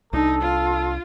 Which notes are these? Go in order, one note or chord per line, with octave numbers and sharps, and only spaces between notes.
C2 D4 D#4 A4
F4